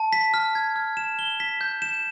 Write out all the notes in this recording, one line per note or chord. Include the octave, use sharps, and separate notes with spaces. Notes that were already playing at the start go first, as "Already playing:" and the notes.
Already playing: A5
B6
F6
G#6
F6
E7
G7
B6
G6
E7